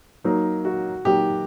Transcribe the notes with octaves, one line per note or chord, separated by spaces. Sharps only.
F#3 A#3 D#4
F#4
F#3 A#3 D#4 G4